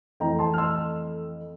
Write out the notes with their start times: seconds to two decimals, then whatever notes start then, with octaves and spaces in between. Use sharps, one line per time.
0.20 F2 E3 A3 G5 A#5
0.39 A5 C6
0.54 F6
0.58 C6 E6